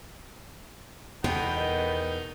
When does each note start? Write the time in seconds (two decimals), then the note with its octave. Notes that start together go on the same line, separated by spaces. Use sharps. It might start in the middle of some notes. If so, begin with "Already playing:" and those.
1.24 E2 B2 B3 D#4 A4 G5 A5
1.57 A#4 D#5